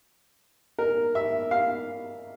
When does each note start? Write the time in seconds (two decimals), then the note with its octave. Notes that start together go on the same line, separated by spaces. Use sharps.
0.79 A#4
1.15 E5
1.51 F5